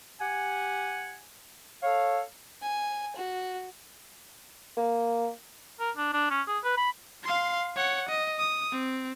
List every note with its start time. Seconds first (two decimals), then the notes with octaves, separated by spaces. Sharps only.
0.20 G4 F#5 G#5
1.82 A4 C#5 F5
2.62 G#5
3.16 F#4
4.77 A#3
5.80 A#4
5.97 D4
6.13 D4
6.30 C#4
6.47 G#4
6.64 B4
6.77 B5
7.24 F5 C6
7.76 C#5 F#5
8.09 D#5
8.39 D#6
8.72 C4